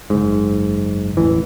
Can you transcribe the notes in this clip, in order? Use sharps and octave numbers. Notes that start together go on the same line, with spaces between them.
F#1 G#2
E1 A1 E3